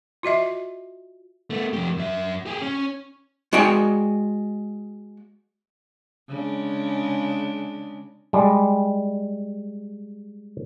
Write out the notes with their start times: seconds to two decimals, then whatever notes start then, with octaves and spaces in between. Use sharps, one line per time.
0.23 F4 F#4 D#5 E5
1.50 A3 B3
1.73 F2 G4
1.97 F#2 E5
2.46 G4 G#4
2.62 C#4
3.53 G#3 F#4 D5 D#5 G5 G#5
6.29 C#3 G#3 D4
8.33 G3 G#3